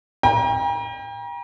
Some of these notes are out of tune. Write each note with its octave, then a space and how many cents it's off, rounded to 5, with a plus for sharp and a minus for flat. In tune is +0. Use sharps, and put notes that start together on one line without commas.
G5 +35 A#5 +35